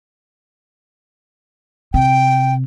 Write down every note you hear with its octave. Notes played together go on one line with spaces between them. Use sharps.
C3 G5